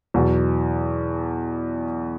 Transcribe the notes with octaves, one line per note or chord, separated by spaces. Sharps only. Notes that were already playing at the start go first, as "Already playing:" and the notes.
E2 B2 F#3